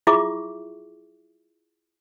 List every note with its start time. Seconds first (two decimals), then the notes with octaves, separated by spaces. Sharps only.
0.07 E4 F4 G#4 E5 C#6 D6